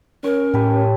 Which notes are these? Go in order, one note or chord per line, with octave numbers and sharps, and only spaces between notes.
C#4 A#4 C#5
A2 G4 A4 B4